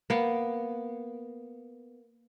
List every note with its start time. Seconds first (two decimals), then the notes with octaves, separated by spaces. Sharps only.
0.10 A#3 B3